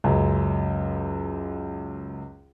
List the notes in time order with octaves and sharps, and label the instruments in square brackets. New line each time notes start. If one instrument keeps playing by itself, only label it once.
[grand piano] C#2 F#2